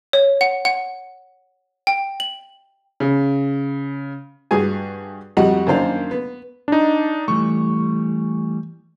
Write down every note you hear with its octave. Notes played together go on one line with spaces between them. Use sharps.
C#5
F#5
F#5
G5
F#7
C#3
G2 F#4 G#4 G#5
F2 G3 F#4 D#5 F#5
F#2 D#3 A#3 D4 C5 F5
B3
D4 D#4
E3 G3 A3 C#6